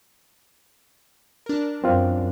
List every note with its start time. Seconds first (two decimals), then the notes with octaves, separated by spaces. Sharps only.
1.46 D4 A#4
1.84 F#2 C4 F4